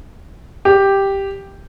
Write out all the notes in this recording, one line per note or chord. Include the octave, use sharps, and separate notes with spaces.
G4